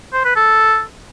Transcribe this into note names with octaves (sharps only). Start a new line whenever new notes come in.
C5
B4
A4